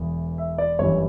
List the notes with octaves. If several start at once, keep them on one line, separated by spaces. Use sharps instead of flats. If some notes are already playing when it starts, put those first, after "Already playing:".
Already playing: E1 E2
E5
D5
G1 F#2 E3 G3 C#5